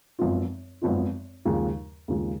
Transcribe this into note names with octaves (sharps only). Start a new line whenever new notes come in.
G#1 F#2 F3 B3 F4
G#1 F#2 F3 B3 F4
D#2 C#3 F3 G#3
D#2 C#3 F3 G#3